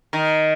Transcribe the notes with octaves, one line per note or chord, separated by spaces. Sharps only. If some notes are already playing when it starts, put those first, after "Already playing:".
D#3